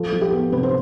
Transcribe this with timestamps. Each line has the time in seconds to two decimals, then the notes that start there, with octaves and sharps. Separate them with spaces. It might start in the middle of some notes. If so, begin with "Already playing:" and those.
Already playing: F3 A4
0.12 F3
0.22 G4
0.32 B3
0.52 C3 B4
0.63 C5